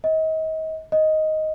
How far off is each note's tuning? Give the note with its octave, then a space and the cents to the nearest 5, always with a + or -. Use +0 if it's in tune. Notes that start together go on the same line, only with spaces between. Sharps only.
D#5 +35
D#5 +5